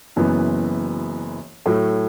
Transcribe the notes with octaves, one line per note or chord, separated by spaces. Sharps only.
F#1 F#2 E3 B3
A2 F#3 A3